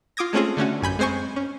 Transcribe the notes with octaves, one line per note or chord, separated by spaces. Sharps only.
F4 D6 D#6 G#6 A#6
G#3 A3 C4 C#4 F4 G#4
D3 A3 C#4 F#4
A1 F#2 G#5 B5 G6
G#3 C4 C5 G#5 C#6
C#4